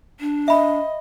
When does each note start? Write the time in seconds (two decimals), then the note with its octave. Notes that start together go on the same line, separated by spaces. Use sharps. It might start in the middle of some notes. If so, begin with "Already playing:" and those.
0.20 D4
0.48 D#5 E5 B5